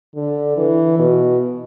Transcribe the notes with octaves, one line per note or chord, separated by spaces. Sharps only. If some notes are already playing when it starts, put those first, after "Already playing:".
D3
E3
B2